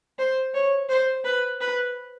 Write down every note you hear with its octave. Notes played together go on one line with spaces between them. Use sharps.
C5
C#5
C5
B4
B4